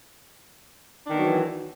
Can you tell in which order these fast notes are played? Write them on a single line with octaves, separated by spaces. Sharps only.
D4 D#3 B3 F#3 E3